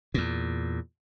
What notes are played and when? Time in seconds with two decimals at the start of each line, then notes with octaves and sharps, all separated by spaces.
0.14 E2 A#2